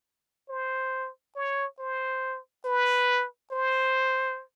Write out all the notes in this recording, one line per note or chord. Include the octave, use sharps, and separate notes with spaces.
C5
C#5
C5
B4
C5